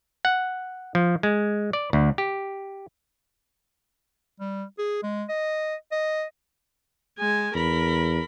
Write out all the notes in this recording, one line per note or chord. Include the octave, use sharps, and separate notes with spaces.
F#5
F3
G#3
D5
D2
G4
G3
G#4
G#3
D#5
D#5
G#3 G#5
E2 A#4 B5